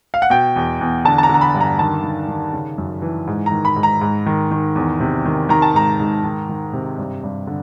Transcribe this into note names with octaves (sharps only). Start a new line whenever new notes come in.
F5
F#5
B2 G5
E2
E2
D3 A5
A5
A#5
D3
A#5
B5
G2
A#5
D#3 A5
D#3
D#3
C#3
F#2
E3
G#2
A#5
D#3
B5
G#2
A#5
G#2
D#3
D#3
E2
C3
D#3
D#3 A#5
A5
G#2 A#5
G#2
D#3
D#3
C3
G2
G2
D3